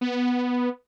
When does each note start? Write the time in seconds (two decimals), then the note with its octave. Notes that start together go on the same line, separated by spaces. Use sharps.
0.01 B3